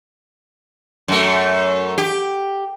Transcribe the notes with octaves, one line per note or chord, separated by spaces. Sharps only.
F#2 A3
G4